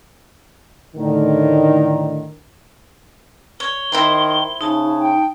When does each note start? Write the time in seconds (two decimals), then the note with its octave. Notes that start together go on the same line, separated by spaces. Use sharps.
0.96 A2 D3 D#3
3.60 C#5 G7
3.92 D#3 E4 C5 C6
4.61 C#3 D#4 A5
4.99 G5